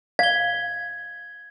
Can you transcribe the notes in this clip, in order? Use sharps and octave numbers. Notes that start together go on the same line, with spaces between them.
F5 G#6 G7